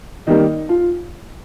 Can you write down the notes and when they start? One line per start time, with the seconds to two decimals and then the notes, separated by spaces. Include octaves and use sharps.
0.27 D#3 G3 A#3 D#4
0.69 F4